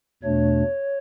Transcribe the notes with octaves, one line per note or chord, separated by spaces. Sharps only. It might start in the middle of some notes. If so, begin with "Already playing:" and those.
E2 B2 A3 D4 C#5